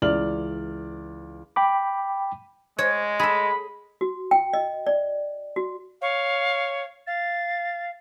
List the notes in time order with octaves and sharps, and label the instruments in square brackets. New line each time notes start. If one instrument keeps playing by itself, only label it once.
[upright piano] C#2 E3 D5 F6 F#7
[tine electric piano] G5 B5 D6
[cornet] G#3 [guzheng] C#5
[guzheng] G#4 A4 [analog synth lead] B5
[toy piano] F#4
G5
D#5
D5
F#4
[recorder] C#5 [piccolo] F5
[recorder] F5 [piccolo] A6